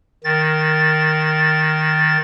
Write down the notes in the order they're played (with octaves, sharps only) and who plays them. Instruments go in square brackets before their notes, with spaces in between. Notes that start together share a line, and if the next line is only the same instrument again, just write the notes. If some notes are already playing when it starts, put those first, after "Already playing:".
[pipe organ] D#3 A6